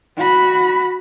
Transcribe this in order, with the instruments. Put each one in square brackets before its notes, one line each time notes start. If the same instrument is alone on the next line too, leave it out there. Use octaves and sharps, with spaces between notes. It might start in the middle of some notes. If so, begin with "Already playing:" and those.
[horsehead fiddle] F#4 B5